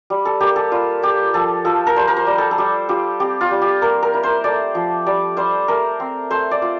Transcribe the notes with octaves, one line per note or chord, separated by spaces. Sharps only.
G3
A4
A#3 G4
A4
G3 F4
F4 G4
F3 A4
F3 A4
A#4
G3 C5
A#4
C5
G3
A4
A4
G3 G4
F4 G4
C4 G4
F4
G3
G4
A#3 A#4
A#4
E4
C5
A3 D5
F3
G3 D5
G3 C5
A3 A#4
C4
A3 C5
D5
F4